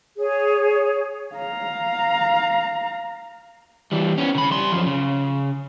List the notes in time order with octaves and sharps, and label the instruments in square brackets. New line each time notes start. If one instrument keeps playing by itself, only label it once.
[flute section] G#4 C#5
[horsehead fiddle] F5 A#5
[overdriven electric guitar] E3 G3
B3 C#4
C#3 B5
G3 C6
F#2 F3
C#3